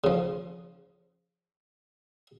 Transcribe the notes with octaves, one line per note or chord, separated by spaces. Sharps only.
C#3 F3